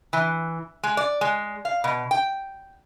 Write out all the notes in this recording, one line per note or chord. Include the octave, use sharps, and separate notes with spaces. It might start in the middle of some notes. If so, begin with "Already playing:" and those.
E3
G#3
D5
G#3
F5
B2
G5